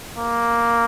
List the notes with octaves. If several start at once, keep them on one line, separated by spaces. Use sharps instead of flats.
A#3